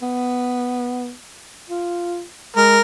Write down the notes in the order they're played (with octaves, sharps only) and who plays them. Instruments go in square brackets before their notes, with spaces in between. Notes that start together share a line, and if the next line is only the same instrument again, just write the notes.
[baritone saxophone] B3
F4
[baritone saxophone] G#3 [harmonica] A#4